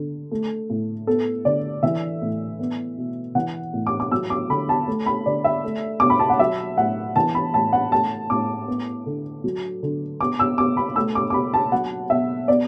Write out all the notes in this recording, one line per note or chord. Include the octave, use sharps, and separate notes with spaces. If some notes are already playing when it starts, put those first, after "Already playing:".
Already playing: D3
A3
A2
B3 A4
D3 D5
E3 E5
A2
B3
B2
E3 F#5
A2
D6
D6
F#3 E6
D6
D3 B5
A5
A3
B5
D3 D5
E5
A3
B2 D6
B5
A5
F#5
F#3 E5
A2 F#5
E3 A5
B5
A2 A5
F#5
A3 A5
A2 D6
B3
D3
F#3
D3
B3 D6
E6
B2 D6
B5
A3 E6
D6
D6
B2 B5
A5
F#3 F#5
B2 E5
B3 D5